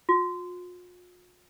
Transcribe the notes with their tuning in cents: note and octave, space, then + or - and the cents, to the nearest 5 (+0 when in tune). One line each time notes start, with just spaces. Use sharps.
F4 +40